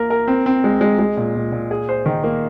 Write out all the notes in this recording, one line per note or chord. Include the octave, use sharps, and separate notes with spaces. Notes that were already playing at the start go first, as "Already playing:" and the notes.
Already playing: A#3 A#4
A#4
C4
C4
G#3
G#3
G#3
A#2
A#2
A#2
G#4
C5
D#3
A#3